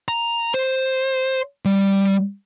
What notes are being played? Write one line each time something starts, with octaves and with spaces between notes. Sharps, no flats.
A#5
C5
G3